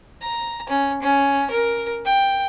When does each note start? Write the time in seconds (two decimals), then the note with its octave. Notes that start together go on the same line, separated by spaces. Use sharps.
0.21 A#5
0.69 C#4
1.02 C#4
1.50 A#4
2.05 G5